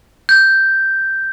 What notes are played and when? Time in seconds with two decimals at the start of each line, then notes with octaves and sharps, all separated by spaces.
0.29 G6